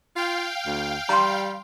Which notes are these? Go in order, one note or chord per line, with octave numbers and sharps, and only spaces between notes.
F4 F5 G5
D2
G3 A#5 C6